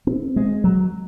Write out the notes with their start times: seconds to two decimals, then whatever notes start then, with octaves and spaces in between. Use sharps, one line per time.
0.07 C4
0.36 G#3
0.64 F#3